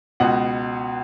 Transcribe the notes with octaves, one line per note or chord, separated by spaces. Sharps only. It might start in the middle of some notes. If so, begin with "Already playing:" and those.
C#2 B2 F#5